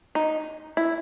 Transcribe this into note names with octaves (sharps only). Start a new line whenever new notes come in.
D#4
E4